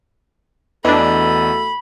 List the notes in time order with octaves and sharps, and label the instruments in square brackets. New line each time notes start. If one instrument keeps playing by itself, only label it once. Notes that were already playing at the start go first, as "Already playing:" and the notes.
[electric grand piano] E2 D#5 [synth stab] E3 D4 [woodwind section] A3 F#4 A4 [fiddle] B5